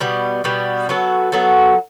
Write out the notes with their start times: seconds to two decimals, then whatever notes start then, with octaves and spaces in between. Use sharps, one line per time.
0.01 B2 G3 B3
0.44 B2 G3 B3
0.89 F#3 B3 F#4 A4
1.32 F#3 B3 F#4 A4